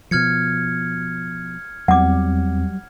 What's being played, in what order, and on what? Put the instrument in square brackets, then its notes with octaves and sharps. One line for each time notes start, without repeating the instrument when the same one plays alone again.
[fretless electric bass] B2 F3 [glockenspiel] F6 G#6 C#7
[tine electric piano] E2 C4 [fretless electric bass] F#3 G3 [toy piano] F#5 D6